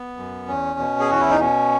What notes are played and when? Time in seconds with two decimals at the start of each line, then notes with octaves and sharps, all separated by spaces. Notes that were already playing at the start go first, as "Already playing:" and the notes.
Already playing: B3
0.17 F#2
0.48 E2 C#4
0.79 B2
1.00 G#4
1.10 E2 F#4
1.21 E4
1.30 D#4
1.40 B2 C#4